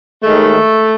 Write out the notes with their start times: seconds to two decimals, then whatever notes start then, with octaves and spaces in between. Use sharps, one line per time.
0.24 D#2 D#3 G#3 A3